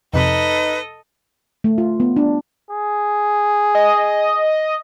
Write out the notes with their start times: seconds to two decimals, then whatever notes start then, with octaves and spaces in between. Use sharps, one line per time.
0.13 F2 C3 D#4 A4 B4 D#5
1.64 A3
1.78 F4
2.00 B3
2.16 D4
2.71 G#4
3.75 D#5